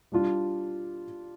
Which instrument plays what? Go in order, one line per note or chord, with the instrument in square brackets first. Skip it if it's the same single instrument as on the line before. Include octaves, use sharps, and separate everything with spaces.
[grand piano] G3 D4 F4